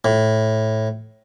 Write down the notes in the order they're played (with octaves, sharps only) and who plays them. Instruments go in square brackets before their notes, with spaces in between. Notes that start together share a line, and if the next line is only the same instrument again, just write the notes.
[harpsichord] A2